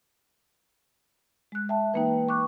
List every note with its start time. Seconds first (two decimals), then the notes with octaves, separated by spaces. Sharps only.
1.52 G#3 F#6
1.69 E5 G5 A5
1.94 E3 A#3 D#4 B4 G5
2.29 B4 C#6 D6 F#6